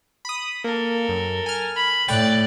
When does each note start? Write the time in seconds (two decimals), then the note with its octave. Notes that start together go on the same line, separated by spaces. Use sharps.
0.25 B5 D#6
0.64 A#3 A4 A#4
1.09 F#2
1.46 G#5 F6
1.76 B5
2.08 A2 D5 G5 F#6 A6